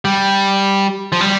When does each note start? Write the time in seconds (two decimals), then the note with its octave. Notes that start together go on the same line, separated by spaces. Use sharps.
0.05 G3
1.12 F3
1.21 G3